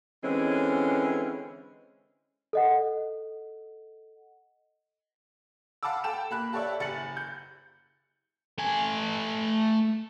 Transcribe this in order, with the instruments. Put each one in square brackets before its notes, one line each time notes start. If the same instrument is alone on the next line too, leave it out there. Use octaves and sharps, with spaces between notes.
[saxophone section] D3 E3 G#3 C4 C#4
[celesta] A4 D#5 F#5
[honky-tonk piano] F5 F#5 A5 B5 D6 E6
A4 G5 E7
A#3 B5 F#6
G4 A4 C#5 D5 E5
F#1 A6 C#7 F#7
G6
[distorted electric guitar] A3 G#5